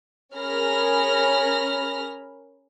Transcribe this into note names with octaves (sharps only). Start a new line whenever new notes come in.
C#4 G#4 A#4 B5 F6 A#6